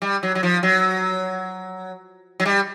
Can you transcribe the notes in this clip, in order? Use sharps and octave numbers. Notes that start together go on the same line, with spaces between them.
G3
F#3
F#3
F3
F#3
F#3
G3